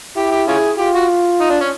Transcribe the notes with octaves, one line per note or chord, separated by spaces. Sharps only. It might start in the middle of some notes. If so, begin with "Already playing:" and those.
E4 G4
G4
C#4 F4 G#4
F4 G4
F#4
D#4
D4
C#4